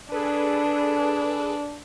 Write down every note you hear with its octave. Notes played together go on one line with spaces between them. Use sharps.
D4 G#4 A4 B4